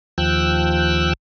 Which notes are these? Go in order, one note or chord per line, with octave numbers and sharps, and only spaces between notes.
D#2 F3 G5 E6 F#6